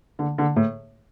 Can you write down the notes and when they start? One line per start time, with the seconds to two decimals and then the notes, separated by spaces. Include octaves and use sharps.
0.19 D3
0.38 D3
0.56 A2